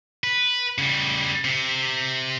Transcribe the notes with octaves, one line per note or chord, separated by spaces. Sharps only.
B4
C#3 G3
C3